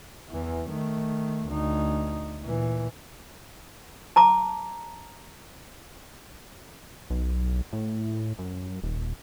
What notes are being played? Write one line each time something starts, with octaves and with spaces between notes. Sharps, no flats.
E2 E3
D#3 A3
D2 D#4
A#2 E3
A5 A#5 D6
B1
A2
F#2
D#1